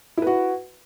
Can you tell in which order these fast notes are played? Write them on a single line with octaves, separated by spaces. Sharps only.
E4 B4 F#4